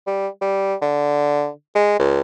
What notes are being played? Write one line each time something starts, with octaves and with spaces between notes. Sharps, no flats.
G3
G3
D3
G#3
C#2